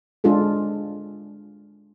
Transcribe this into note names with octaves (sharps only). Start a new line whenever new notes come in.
G#3 D4 F4 G#4 A4